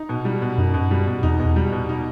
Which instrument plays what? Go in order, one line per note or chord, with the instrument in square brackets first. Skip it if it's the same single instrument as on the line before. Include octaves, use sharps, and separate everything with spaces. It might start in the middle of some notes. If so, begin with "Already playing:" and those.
Already playing: [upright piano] D#4
B2
G3
B2
[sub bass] F#2 [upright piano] D#4
[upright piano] B2
G3
B2
[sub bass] E2 [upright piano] D#4
[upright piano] B2
G3
B2
D#4